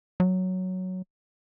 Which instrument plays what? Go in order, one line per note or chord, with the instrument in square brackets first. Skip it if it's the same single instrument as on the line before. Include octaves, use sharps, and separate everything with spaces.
[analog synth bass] F#3